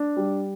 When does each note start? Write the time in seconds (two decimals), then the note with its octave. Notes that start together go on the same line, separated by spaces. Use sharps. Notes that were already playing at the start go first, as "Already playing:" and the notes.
Already playing: D4
0.17 G3